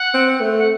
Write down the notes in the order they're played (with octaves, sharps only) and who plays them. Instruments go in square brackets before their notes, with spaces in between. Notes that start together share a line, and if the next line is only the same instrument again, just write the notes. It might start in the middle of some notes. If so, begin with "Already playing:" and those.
Already playing: [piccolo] F#5
[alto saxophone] C4
A3
[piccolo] F#5